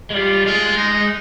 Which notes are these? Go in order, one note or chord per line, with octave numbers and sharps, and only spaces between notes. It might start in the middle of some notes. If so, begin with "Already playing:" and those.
G#3
G3 F4
G#3 F4
D#4